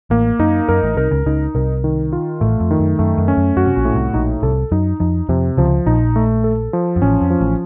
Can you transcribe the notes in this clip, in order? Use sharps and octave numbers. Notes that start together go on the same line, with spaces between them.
A1 A2 A#3
F#2 D#4
F#2 A#4
A1 A2
C2 C3 A#4
C#2 C#3
C#2 C#3 D#4
C2 C3 A#4
D#3
F4
A1 A2 A3
F2
D#3
F#2
F#2 A3
F#2
C#4
F#2
F#2 F#4
C3
A#1 A#2
A2
C2 C3
A#1 A#2 D#4
C2 C3 A4
F#2 F#3 D#4
F2 F3 D#4
F2 C3 F3
C#2 C#3 F3
A#1 A#2 D#4
A3
A4
F3
F#2
A1 A2 C#4
F2
F3
A1 A2